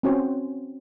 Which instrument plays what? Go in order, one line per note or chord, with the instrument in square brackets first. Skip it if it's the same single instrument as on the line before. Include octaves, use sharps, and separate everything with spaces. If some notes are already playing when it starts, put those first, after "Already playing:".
[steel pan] C4 C#4 F#4 C5 C#5 G5